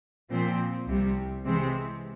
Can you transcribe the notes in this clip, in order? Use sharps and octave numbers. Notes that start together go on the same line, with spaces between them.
A#2 F3 C4
C2 C3 G3
C3 E3 G#3 C4